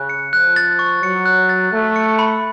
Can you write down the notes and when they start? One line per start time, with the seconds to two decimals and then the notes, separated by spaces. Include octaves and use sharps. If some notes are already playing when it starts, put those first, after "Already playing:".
Already playing: C#3 F#6
0.09 C#7
0.33 F3 F#6
0.56 A6
0.79 C#6
1.03 F#3 C#7
1.26 F#6
1.49 A6
1.72 A3 F#6
1.96 C#7
2.19 B5